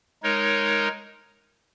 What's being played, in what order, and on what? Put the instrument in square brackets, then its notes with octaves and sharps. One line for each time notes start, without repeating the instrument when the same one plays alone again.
[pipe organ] G#3 D#4 A#4 C#5